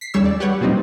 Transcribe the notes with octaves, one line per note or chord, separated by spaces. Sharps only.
B6 C7
D#2 C#3 G3 C#5 E6
D5
G4 B4 C#5 F#5
A#2 F#3 G3 C4 D#4